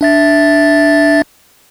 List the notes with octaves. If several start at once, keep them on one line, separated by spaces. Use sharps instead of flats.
D4 E5 A6